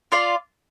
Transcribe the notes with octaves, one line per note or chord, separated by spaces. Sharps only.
F4 D5 F5